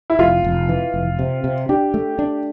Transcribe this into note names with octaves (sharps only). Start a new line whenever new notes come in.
E4
F1 F4
F1
E3
F1
C3
C3
D4 G4
A3
D4